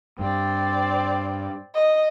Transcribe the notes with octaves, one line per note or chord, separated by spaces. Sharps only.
G2 C4 D5
D#5